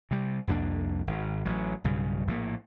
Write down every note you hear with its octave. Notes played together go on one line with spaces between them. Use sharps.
C3 G3
C2 F2 A#3 D4
G#1
A1 F#3
B1 G2 C#3
A#1 A2 E3 A#3